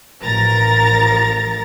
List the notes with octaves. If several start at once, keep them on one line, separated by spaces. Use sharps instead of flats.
A1 F3 A#4 A#5 A6